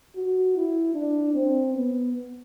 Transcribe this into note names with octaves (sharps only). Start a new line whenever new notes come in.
F#4
E4
D4
C4
B3